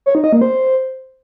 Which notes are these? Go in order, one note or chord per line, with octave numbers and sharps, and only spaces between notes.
C#5
D#4
D#5
A#3
C5